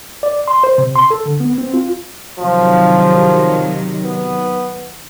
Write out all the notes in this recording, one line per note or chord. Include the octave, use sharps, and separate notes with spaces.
D5
C6
C5
C3
C6
A4
D3
B3
C4
F4
C3 D#3 F3 F#3
B3